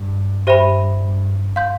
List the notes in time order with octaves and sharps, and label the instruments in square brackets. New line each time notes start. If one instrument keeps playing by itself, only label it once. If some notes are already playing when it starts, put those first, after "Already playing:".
Already playing: [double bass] G2
[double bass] G2 [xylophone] G4 C5 E5 G5 B5
[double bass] G2
[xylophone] F5 C6 G6